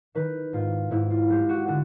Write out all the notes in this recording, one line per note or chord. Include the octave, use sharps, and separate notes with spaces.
D#3 B4
G#2 F4
G#2 E4
F4
G#3 G4
F#4
D3 F#4